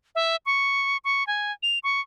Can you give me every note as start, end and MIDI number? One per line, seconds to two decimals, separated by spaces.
0.15 0.36 76
0.46 0.97 85
1.04 1.26 85
1.27 1.52 80
1.63 1.79 101
1.83 2.01 85